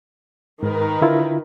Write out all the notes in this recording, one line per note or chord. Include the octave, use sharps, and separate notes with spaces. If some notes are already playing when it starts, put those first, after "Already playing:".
G#2 D#3 A#4 B4
D3 E4 F4